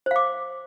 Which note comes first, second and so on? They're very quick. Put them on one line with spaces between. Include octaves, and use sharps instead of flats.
C5 F5 D6